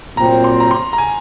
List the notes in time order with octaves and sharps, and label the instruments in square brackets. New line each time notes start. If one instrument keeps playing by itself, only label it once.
[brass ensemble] A#2 F#3 C4 [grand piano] A#5
[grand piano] C6
A#5
C6
A#5
G#5